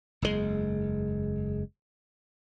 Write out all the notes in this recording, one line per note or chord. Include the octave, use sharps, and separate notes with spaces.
F#1 E2 C3 G#3